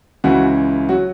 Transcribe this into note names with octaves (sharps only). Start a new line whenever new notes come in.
C#2 C#3 E3 F#4
F#3 F#4